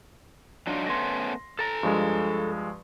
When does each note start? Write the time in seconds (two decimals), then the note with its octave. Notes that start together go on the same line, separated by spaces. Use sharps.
0.67 F#3 D4 D#4 F4
0.87 A3 B3 C#4 C6 A#6
1.59 A4 A#5 A6 A#6
1.83 G2 F3 G#3